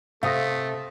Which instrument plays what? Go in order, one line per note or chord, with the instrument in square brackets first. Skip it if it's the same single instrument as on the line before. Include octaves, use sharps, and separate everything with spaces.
[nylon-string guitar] C3 [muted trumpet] A3 [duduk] A4 [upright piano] F5 D#6 A#6